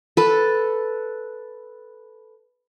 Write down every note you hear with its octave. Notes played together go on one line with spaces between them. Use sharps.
A4 B4